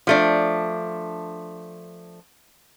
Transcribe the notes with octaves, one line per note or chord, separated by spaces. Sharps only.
F3 A3 D4